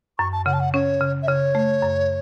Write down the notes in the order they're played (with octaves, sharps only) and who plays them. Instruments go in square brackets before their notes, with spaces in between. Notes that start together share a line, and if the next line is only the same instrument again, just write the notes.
[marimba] F#2 [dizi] C#6
[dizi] A5
[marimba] C#3 [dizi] F#5
[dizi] A5
F#5
[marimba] C#4 [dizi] C#5
[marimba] C#3
[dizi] E5
[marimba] C#3 [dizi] C#5
[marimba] A3
F#2